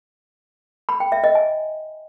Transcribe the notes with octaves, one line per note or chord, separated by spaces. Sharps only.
B5
G5
E5
D#5
G#5